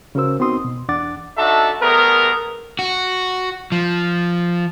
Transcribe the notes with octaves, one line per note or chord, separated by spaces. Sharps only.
C#3 C#4 F#4 A#4 C5 E6
B3 C4 D#4 F#4 C6 D#6
B2
E2 D4 F#5 D6 A6
D4 D#4 F#4 A4 E5 A5
G3 A3 B3 G#4 A#4
F#4
F3